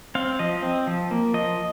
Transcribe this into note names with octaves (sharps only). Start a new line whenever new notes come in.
C4 F5
F3 D#5
C4
F3
A#3
F3 D#5